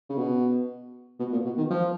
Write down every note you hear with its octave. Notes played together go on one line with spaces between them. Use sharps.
C#3
B2
B2
A#2
B2
D#3
F3